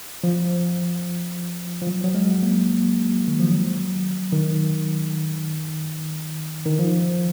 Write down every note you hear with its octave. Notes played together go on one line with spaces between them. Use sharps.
F3
F3
F#3
F#3
G#3
A#3
D#3
F3
F#3
D#3
D#3
F3